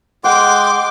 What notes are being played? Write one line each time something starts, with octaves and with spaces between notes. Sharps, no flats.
G#3 F#5 G5 C6 D6